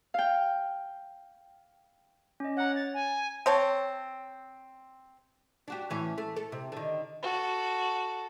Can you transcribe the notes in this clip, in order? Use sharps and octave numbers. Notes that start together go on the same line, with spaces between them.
F5 G5
C#4 D#5
C#5 F#5 A#5
A6
G#5
C4 C#5 A5
D4 F#4 G4
A2 E3 C#4
A3
A4
C3
D3 D#3
F#4 A4